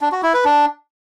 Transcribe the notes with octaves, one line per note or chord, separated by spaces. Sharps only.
D4
F#4
E4
B4
D4